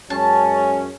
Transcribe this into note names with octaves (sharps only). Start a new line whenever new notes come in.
F#2 G#3 C#4 A5